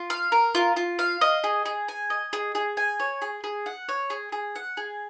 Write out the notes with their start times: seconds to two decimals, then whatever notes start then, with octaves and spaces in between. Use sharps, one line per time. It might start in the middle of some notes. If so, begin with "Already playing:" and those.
Already playing: F4
0.10 F5
0.32 A#4
0.55 F4
0.76 F4
0.99 F5
1.21 D#5
1.44 G#4
1.65 G#4
1.88 G#5
2.10 D#5
2.33 G#4
2.55 G#4
2.77 G#5
3.00 C#5
3.22 G#4
3.44 G#4
3.66 F#5
3.89 C#5
4.10 G#4
4.32 G#4
4.56 F#5
4.77 G#4